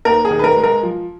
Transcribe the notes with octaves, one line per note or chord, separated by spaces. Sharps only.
D#2 A#4
G#4
D#3
B4
A#4
G#3
A#4
F3